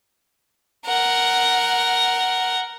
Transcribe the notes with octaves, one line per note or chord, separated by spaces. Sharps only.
A#4 F#5